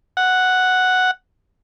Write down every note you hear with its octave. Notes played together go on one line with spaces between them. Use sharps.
F#5